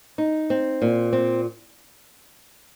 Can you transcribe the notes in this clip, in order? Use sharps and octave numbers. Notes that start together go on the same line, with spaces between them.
D#4
C4
A#2
C4